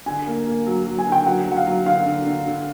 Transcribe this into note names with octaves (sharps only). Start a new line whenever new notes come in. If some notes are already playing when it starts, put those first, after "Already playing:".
D3 G#5
A#3
A#3
F#3
F#3
G#5
D3
G5
F#3 F#5
F#3
F#5
F5
F#3
D3 F5
D3
D3
D3